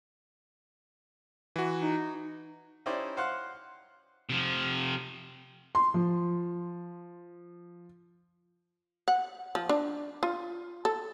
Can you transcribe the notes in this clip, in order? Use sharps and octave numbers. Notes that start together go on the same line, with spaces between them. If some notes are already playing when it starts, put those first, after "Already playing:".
E3 F#4
D#4
C#4 D#4 E4 G4 C5 D5
C5 F5 F#5 C6 F#6
C3 F3
C6
F3
F#5
F3
D4
F4
A4